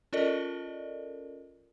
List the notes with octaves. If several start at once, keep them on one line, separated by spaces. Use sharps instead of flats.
C#4 F4 A4 A#4 D5 D#5